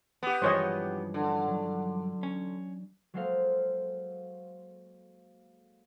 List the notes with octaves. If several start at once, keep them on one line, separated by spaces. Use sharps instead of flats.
B3 G4
G2 E3 F3 G#3 C#4 C5 C#5 D#5
D3
F#3
C#4
F#3 G#3 A#3 A4 C5 F5